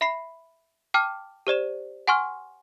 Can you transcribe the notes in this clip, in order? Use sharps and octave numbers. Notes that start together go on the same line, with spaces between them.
E5 B5 C7
G5 A5 D6 F6
G4 C5 D5 E7
F#5 G#5 C6 C#6 F6